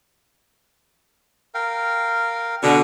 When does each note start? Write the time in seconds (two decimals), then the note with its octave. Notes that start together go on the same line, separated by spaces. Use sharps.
1.54 A#4 F5 G5
2.63 B2 D3 D#5 F#5